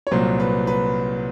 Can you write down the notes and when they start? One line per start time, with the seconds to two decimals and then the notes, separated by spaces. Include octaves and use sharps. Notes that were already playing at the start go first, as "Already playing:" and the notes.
0.07 C#5
0.11 C2 A#2 F#3 C5
0.40 B4
0.67 B4